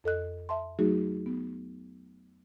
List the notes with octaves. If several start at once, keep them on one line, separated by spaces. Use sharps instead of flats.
F2 A4 D#5 F#6
E5 A5 C6
F#3 A3 D#4 F#4 G#4
B3